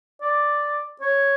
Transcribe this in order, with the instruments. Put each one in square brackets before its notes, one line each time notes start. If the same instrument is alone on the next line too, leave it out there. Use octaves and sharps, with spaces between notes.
[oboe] D5
C#5